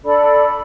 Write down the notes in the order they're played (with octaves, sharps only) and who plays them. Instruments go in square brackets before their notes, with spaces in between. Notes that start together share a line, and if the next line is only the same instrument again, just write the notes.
[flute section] D4 A4 D5 B5